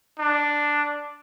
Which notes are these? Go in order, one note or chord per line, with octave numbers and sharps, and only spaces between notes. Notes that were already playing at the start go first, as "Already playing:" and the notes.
D4